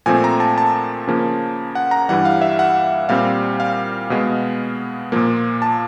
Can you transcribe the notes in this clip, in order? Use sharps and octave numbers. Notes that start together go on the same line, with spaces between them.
A#2 F3 A3 C4 G#5
A#5
A5
A5
C#3 F3 A#3 C#4
F#5
A#5
G2 E3 G3 F#5
F5
E5
F#5
A#2 G3 C4 F5
F5
B2 G#3 B3
A#2 F3 A#3
A5